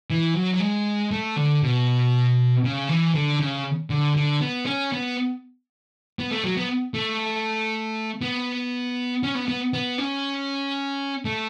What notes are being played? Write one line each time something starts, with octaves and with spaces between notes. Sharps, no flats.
E3
F#3
F#3
G#3
A3
D3
B2
C#3
E3
D3
C#3
D3
D3
B3
C#4
B3
B3
A3
F#3
B3
A3
B3
C#4
B3
B3
B3
C#4
A3